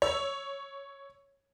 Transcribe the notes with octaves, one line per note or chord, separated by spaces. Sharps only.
C#5 E6